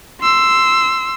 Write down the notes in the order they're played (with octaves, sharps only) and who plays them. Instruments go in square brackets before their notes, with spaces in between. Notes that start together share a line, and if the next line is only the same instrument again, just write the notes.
[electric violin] C6 E6